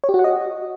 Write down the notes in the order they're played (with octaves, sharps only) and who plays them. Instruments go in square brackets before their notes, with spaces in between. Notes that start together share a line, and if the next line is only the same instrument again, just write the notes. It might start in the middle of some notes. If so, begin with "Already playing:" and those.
[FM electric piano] C#5
G4
F#4
F#5
D#5